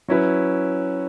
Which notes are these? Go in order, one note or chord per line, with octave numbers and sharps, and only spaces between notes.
F#3 C#4 E4 B4